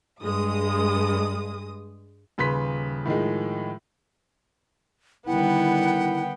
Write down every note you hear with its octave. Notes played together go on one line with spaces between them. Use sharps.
G2 G#3 D#6
D#1 C#3 B4 C6 B6
A2 D#3 F3 G#3
D3 D#3 G3 B3 E4 F#5 G5